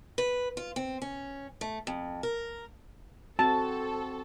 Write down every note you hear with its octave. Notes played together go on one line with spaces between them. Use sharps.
B4
F4
C4
C#4
A3
F2
A#4
C4 F#4 A4 A5